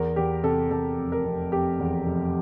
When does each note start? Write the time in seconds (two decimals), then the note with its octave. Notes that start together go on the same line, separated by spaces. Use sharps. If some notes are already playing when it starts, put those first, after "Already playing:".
Already playing: E2 A#4
0.16 E2 G4
0.43 C3 A4
0.70 E2 A4
0.97 F1
1.12 A#4
1.24 F1
1.52 F1 G4
1.80 E2
2.06 F1